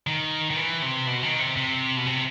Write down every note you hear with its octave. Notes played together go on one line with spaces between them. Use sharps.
D#3
D#3
E3
C3
B2
D#3
C3
C3
B2
C3